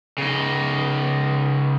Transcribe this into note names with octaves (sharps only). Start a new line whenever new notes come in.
C#3 D#4